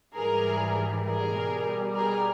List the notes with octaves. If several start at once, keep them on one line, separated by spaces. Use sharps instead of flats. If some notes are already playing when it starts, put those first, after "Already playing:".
G#2 E3 G3 G#4 A#4
G#4 A#4
B2 G3
G#4 A#4